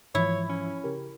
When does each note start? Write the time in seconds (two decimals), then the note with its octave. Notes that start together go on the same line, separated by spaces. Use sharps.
0.15 G#2 E3 F3 E4 C#5
0.49 C#4
0.84 C#3 G4 A#4